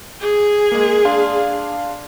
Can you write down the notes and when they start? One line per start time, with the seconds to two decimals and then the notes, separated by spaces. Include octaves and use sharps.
0.21 G#4
0.72 G#3 A#3
1.05 D4 F5 C6